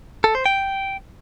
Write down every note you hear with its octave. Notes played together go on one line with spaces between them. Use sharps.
A4
C5
G5